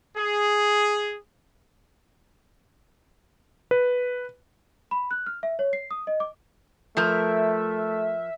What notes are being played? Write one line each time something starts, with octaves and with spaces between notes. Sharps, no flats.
G#4
B4
B5
F#6
F6
E5
C#5
C7
D#6
D#5
D6
F3 A3 A#4 E5